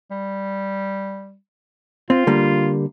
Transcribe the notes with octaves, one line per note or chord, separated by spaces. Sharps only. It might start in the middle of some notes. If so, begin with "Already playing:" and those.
G3
C4 F4
D3 G3 A#3